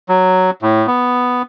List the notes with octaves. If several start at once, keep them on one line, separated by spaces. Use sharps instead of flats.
F#3
A2
B3